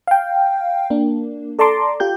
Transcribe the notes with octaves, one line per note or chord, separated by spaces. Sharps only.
F5 G5
A#3 D4
A4 D5 A5 A#5 C6 D6
F4 G4 G6